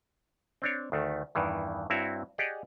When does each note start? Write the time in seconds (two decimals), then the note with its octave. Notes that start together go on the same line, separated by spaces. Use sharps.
0.62 C4 D4 C#5
0.92 D2 D#3 A3
1.35 E2 G2 D#3 E3
1.90 G2 C4 E4 F#4 C#5
2.38 G4 G#4 D5 D#5 F#5